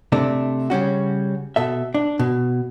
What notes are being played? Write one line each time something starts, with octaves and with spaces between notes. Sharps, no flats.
C3 A3 D4
C#3 G3 C#4 F#4
B2 A4 E5
D4
B2